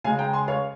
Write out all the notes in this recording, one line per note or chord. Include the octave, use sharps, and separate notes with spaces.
C#3 G#3 F5 G#5
G5 A#5
G#5 C6
C#5 F5